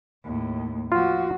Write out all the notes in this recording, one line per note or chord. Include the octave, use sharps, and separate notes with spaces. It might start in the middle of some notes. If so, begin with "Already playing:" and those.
D#2 A2
F3 F4 F#4